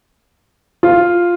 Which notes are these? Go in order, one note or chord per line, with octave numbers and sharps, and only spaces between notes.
F4